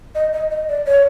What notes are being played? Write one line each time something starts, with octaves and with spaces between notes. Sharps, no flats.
D#5
D#5
D#5
D5
C#5